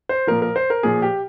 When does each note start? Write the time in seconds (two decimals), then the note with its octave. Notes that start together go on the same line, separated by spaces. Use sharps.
0.09 C5
0.27 A#2 F3 A#4
0.42 A#4
0.56 C5
0.70 A#4
0.83 A#2 F3 G#4
1.02 G4